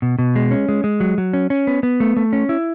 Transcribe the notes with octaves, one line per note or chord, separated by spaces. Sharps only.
B2
B2
G#3
C#4
G#3
G#3
F#3
F#3
C#4
C#4
B3
B3
A3
A3
C#4
E4